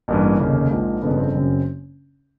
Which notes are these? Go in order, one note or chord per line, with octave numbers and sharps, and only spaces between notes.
A1 G2 E3 A#3
A#3
F1 D#2 C#3
A#1 G#2 F3
G1 F2 C#3 B3
C4
F#1 F#2 C#3